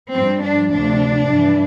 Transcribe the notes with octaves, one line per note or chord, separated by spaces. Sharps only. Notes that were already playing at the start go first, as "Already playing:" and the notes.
G2 F3 C4
D4
D2 C3 F3 D4
G2 E3